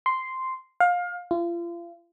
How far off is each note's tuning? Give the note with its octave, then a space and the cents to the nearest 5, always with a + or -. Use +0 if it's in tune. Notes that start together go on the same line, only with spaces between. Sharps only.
C6 -5
F5 +25
F4 -35